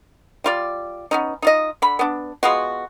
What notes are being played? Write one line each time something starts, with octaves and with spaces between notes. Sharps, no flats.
G3 F4 D5
B3 C#4 D#4
D#4 F4 D#5
D3 B5
B3 D4
G#3 B3 F4 F#4